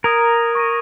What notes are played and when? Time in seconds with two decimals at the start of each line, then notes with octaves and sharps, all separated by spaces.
0.04 A#4 A#5 D#6 G#6 D#7
0.55 C#6 A#6 D#7